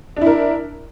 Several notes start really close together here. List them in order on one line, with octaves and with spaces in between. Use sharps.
D4 E4 A#4